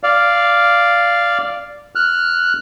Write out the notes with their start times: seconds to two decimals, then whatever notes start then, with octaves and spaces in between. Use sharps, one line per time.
0.03 D5 F5
1.95 F6 F#6